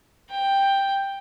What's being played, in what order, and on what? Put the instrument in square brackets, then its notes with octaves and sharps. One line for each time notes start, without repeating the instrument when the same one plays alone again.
[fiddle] G5